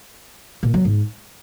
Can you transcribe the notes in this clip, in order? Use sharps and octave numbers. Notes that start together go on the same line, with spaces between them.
A#2
F#3
G#2